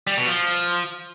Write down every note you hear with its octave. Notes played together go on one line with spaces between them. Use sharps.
G3
B2
F3